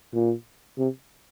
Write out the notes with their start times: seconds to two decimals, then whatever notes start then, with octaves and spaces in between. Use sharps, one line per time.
0.14 A#2
0.78 C3